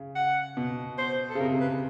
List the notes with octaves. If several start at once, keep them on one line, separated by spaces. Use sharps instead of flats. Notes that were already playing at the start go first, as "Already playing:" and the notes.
Already playing: C#3
F#5
B2
C5
A4
C#3
C3 A#4
B4